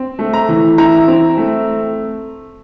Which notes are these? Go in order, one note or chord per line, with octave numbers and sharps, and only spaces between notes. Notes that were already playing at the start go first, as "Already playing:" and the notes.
Already playing: C4
A3
A#5
E3
E4 A#5
C4
A3